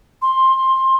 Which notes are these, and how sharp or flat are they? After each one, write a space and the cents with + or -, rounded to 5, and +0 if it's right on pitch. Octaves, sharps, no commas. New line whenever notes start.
C6 +15